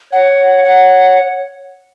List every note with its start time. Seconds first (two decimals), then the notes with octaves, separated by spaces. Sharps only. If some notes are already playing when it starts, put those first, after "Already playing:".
0.12 C#5 F#5
0.64 F#5